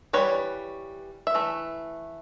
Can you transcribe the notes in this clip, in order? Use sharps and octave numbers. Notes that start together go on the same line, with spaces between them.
E3 G3 A#3 B4 C#5
E5
E3 A3